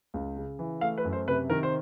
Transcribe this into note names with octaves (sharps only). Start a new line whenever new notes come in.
C#2
C#3
E3
A3 F5
B4
F#2
C5
C3 B4
D#3 A#4
C5